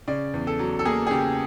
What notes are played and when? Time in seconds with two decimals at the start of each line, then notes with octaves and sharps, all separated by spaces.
0.08 C#3 D5
0.34 E2
0.47 A4
0.59 F#3
0.79 A4
0.85 A#3 G#4
1.07 G#4
1.11 C#3 G4